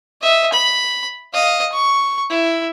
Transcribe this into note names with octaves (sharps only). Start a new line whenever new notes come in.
D#5 E5
B5
D#5 F5
C#6
E4